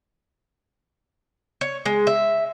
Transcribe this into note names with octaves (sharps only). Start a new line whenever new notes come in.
C#5
G#3
E5